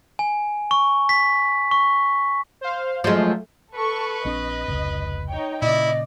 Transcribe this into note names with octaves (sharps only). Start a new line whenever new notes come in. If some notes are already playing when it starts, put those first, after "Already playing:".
G#5
C#6
B6
C#6
C5 F5
F3 F#3 G#3 A3
A4 B4 C#6
A#1 C4 D4 D#5
F1 C#2
D#4 C#5 G5
A#2 C#3 E4 D5 D#5